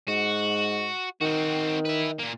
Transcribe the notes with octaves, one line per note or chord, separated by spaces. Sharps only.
G#2 F#4
D#3 C4 F#4
B4 E5
A#2 A#3